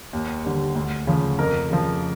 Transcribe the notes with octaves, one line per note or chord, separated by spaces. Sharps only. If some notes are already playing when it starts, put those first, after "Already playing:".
D#2
D3 G3
D2
C#3 F3
F2 A#4
C#3 F3